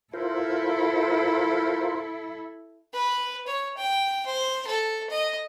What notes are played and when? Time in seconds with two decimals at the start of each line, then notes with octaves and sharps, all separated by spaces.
0.14 E4 F4 A4 A#4 C5
2.93 B4
3.47 C#5
3.77 G5
4.26 C5
4.67 A4
5.10 D#5